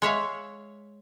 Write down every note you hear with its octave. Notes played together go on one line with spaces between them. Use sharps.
G#3 C#5 E5 F5